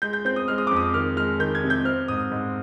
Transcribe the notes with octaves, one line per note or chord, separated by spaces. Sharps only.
G#3 G6
G6
C4 G6
D#6
G#3 F6
D#6
F2 D6
D#6
D#3 F6
G#3 F6
D#3 G6
G#6
C3
G6
C4 F6
G#2 D#6
G#2